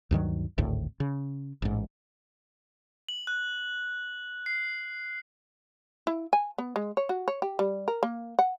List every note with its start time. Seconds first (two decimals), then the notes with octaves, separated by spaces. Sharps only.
0.11 D2 G2 D#3 F#3
0.58 G#1 D2 A2
1.00 C#3
1.62 A1 G#2
3.09 F#7
3.27 F#6
4.46 C7
6.07 E4
6.33 G#5
6.58 B3
6.76 G#3
6.97 C#5
7.09 F#4
7.28 C#5
7.42 G4
7.59 G3
7.88 A#4
8.03 A#3
8.39 F#5